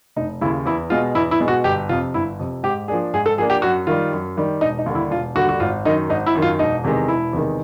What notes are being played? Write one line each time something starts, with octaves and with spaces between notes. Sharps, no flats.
F1 D#4
D#2 C#3 E4
E2 E4
B2 G#3 F4
E2 E4
E4
B2 G#3
F#4
G1 G4
F2 C3 F4
G1 E4
F2 C3
G#2 G4
F3 A#3 D4 G#4
G#2 G#4
A4
F3 A#3 D4 G#4
G4
F#2 F#4
D#3 G3 F4
F#2
D#3 G3
E1 D#4
D#4
D#2 D3 G3
E4
E1 F4
D#2 D3 G3 F#4
F#4
G#1 F4
F#2 D#3 D#4
G#1 D#4
E4
F#2 D#3
F4
E1 D#4
E2 C3 D#3 G#3
E1 E4
E2 C3 D#3 G#3